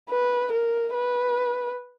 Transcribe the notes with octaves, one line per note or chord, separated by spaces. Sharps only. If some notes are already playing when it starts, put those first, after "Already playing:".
B4
A#4
B4